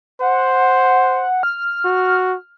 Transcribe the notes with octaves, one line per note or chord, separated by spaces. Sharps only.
C5 F#5
F6
F#4